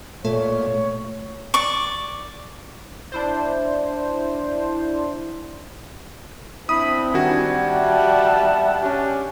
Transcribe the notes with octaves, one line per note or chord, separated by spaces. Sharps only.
A#2 A3 C#5
D5 C#6
D4 E4 C5
C4 D4 E4 B5 D#6
D#3 G3 F#4 G#5
E5 F#5 A5
C#4 D4 G4